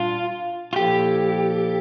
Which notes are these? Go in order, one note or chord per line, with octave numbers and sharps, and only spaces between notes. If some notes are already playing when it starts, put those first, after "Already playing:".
Already playing: A#2 G3 D4 F4
F4
A#2 F3 A#3 E4 G4 A4